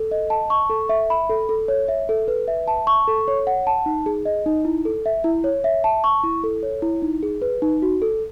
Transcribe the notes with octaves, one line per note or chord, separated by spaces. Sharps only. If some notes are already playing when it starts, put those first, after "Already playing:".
Already playing: A4
D#5
A5
C#6
A4
E5
B5
A4
A4
C#5
E5
A4
B4
E5
A5
C#6
A4
C#5
F#5
A5
D#4
G#4
D#5
D#4
E4
A4
E5
E4
C#5
E5
A5
C#6
E4
A4
C#5
E4
D#4
G#4
B4
D#4
F#4
A4